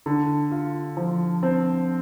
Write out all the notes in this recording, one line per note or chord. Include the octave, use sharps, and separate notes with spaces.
D3
F4
F3
C4